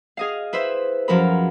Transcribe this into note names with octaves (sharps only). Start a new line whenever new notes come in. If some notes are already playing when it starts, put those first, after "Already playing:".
G#4 D#5 F5
E4 B4 C5 E5
F#2 F3 A#4 B5